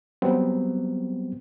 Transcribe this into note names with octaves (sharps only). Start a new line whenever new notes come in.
F#3 G3 B3 C4